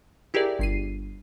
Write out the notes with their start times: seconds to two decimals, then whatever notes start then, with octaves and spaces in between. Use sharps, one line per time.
0.34 E4 G4 G#4 A#4 D5
0.59 G1 C7 D#7